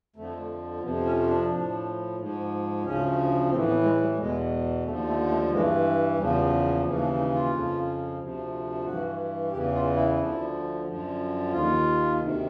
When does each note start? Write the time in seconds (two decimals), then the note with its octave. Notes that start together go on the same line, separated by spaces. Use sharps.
0.16 F2 D3 F3 A3
0.82 F2 C3 F3 B3
1.05 C#4
1.27 D4
1.50 A2 F3
2.17 G#2 F3
2.84 D2 C#3 F3 C#4
3.51 A2 C4
3.54 E3
3.67 B3
3.83 G#3
4.01 G3
4.17 E2 B2 G#3
4.84 D#2 D3 F3 A3
5.06 A3
5.28 A3
5.51 G2 E3 G#3
6.17 E2 C#3 F3 G3
6.35 G3
6.68 A#3
6.84 D#2 C#3 E3 A#3
7.01 D4
7.18 D#4
7.34 F4
7.52 F2 C#3 F3
8.18 D2 C3 F3
8.85 G2 E3 F#4
9.52 E2 C#3 E3 G4
9.74 F4
9.96 E4
10.18 D2 D3 F3
10.86 F#2 D3 F3
11.52 D#2 D#3 F4
12.19 D2 C3 D#3